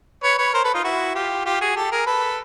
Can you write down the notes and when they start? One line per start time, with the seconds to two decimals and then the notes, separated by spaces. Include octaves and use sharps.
0.23 B4 C#5
0.38 B4 C#5
0.53 A#4 C5
0.64 A4 B4
0.74 D#4 F4
0.84 E4 F#4
1.15 F4 G4
1.46 F4 G4
1.61 F#4 G#4
1.76 G4 A4
1.91 G#4 A#4
2.06 A4 B4